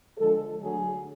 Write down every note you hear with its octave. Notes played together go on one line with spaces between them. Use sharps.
D3 F3 G#3 A4
D3 F#3 A3 G#4